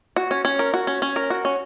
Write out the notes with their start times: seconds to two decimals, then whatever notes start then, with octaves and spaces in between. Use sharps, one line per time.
0.16 F#4
0.31 C#4
0.45 C#4
0.59 A#4
0.74 F#4
0.87 C#4
1.02 C#4
1.16 A#4
1.30 F#4
1.45 C#4